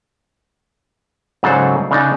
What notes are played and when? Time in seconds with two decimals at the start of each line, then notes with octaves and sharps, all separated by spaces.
1.43 G#2 C#3 F#3 D4 A4 C5
1.91 C#3 D4 D#4 A5